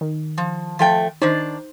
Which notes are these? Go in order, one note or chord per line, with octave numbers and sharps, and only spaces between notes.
D#3
F3
F3 A3 G5
D#3 D4 D#4 C5